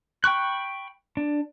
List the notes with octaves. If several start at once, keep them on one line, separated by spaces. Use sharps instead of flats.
G5 B5 C#6 F#6
D4